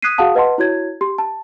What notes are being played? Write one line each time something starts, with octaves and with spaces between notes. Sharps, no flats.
D#6 F#6 G#6 B6 C7 D#7
F#4 G#4 F5 F#5 A5 D#6
B4 D#5 F#5 A5 C6
E4 F#4 C#5 G#6
G4 C6
A5